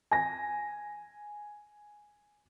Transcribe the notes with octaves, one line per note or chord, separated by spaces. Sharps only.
G#5 A#6